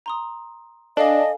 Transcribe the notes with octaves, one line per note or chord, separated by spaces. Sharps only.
A#5 C6 D#6
D4 A4 D#5 F5 G#5